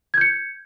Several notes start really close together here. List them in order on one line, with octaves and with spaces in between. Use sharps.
G#6 G6 C#7